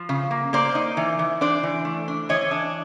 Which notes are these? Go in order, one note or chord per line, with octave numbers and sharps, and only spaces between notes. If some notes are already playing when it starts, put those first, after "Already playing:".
Already playing: F3
C#3
A#3
A#3 C5 D5
D#4
E3
E3
D4 C5 D5
E3
A3
D4
E3 C#5 D#5
D4